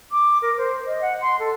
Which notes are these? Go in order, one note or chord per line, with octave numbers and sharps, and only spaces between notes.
D6
A#4
C5
D#5
F#5
C6
A4